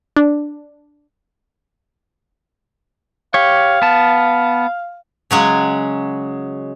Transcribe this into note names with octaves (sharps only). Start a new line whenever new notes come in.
D4
G4 C#5 F5
B3 A5
C#3 F#3 G#3